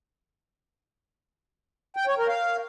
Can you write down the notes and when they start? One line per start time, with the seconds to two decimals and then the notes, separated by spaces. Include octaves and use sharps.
1.97 G5
2.07 C#5
2.18 A#4
2.28 F5